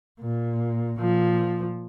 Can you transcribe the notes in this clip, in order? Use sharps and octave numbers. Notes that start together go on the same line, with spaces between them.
A#2
A#2 F3